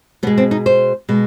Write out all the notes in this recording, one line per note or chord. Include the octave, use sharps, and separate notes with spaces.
B2 G#3 B3
C4
D#4
C5
B2 G#3